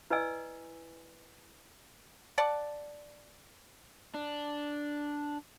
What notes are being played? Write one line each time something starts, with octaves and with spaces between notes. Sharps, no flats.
E4 B4 D5 D#5 G#5 E6
D5 F#5 A5
D4